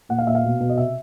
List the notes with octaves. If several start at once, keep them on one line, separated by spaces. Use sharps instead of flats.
A#2 F#5
F5
A#2 E5
F5
B2
B2
D#5
C3 E5